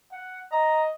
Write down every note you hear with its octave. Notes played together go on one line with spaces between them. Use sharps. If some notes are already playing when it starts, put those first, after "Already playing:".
F#5
D#5 A#5